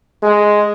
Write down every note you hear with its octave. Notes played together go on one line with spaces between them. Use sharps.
G#3